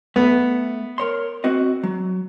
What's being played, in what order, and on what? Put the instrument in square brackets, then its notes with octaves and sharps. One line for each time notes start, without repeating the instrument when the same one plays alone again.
[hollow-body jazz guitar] A3 [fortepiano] B3
[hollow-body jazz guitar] A#4 C#5 C6
C4 F#4 D#5
F#3